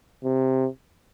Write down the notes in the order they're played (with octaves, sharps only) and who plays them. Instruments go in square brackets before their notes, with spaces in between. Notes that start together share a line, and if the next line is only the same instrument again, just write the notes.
[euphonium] C3